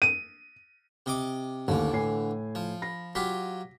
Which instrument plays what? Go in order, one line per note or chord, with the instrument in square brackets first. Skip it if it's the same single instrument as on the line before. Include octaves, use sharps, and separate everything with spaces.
[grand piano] D#7
[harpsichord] C3 D#5 D6
[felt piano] A1 D#2 [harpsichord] D3 E3
[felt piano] A2 G#5 C7
[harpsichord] F3
[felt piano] B5 A#6
[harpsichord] F#3 F4 G4 [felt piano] B6